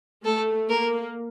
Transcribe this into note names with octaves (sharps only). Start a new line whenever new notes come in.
A3 A4
A#3 A#4